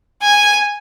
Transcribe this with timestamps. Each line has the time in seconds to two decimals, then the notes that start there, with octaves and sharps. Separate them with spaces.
0.22 G#5